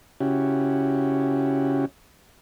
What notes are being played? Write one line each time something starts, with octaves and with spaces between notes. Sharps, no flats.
C#3 C#4 E4 F#4 G4